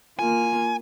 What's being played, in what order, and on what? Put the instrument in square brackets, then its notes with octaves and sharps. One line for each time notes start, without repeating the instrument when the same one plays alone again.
[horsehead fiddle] A#3 F4 [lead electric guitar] G#5